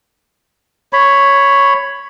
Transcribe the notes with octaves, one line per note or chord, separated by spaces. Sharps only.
C#5 B5